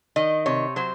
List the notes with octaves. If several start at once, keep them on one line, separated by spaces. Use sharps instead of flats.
D#3 D#5
C3 C#5
F#3 C5